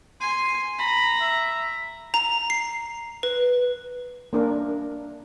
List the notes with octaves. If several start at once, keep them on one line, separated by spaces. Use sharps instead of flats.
G#5 C6
A#5 B5
E5
A#5
C7
B4
A#3 D4 A#4